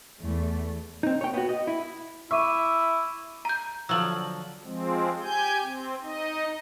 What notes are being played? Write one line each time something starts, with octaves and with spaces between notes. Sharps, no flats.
E2 A3
C4 D#4
C#5 G5
B3 F#4
D#5
E4
E4 E5 C#6 D6 D#7
A#5 G6
D3 F3 F#3 E6 F#7
F3 G#3 C4
G4 G#5 G6
C4
D#4 D#5